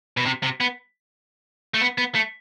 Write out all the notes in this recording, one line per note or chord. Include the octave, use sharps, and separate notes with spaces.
B2
C3
C3
B3
A3
B3
B3
A3